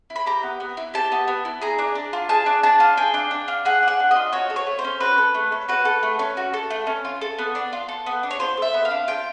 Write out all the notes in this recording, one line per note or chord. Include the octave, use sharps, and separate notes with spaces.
E4
B5
G4 A#5
B3
B3
E4
G4 A5
B3
B3
E4
G#4 A#5
D4
D4
F4
G#4 A5
D4
D4 A5
F4
G#4 G5
D4
D4
F4
G#4 F#5
D4 F#5
D4
F4 D#5
F#4 C#5
A4
C#5
A3
C5
C#4
F#4 B4
A4
A3
C#4
F#4 B4
A4
A3
C#4
F#4
A4
A3
C#4
F4
A4
B3
D4
F4
A4
B3
D4
C#5
F4 C5
A4 E5
B3
F5
D4
F4 G5